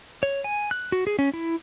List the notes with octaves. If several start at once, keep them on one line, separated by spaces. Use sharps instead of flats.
C#5
G#5
F#6
F#4
G#4
C#4
E4